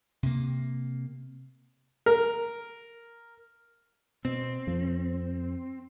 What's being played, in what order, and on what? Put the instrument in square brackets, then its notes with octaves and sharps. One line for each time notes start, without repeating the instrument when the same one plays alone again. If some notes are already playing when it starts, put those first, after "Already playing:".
[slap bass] C3 A#3
[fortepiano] A#4
[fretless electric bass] B2 [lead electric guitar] C4
[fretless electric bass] F2 F3